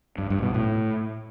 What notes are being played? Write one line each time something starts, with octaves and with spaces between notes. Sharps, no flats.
G2
G2
B2
A2